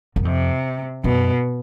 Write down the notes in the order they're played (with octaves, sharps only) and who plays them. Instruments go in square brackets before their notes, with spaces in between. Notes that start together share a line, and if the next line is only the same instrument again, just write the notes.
[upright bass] F#2
[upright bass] F2 [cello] C3
[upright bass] F#2 [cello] B2